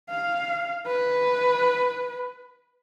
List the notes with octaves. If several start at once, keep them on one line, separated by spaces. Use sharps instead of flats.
F5
B4